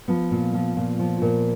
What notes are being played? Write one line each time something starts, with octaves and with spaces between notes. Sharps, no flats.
F3 B3
A#2
F3
A#2
F3
A#2